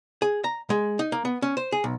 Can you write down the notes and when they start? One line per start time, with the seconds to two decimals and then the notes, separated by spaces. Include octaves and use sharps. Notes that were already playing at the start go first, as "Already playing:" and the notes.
0.22 G#4
0.44 A#5
0.70 G#3
0.99 D#4
1.12 A#3
1.25 B3
1.42 C#4
1.57 C5
1.72 G#4
1.84 B1